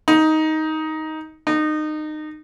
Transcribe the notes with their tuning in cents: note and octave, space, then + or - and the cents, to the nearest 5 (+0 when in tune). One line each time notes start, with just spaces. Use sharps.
D#4 +10
D#4 -25